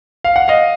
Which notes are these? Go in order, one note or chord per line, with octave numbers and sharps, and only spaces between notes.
F5
F#5
D#5 F5